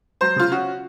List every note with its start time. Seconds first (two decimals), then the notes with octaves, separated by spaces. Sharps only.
0.21 F#3 C5
0.36 C#3 F4
0.52 C#4 F#4